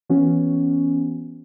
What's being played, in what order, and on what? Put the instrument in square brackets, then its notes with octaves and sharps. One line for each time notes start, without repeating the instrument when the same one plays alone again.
[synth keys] E3 B3 C#4 F#4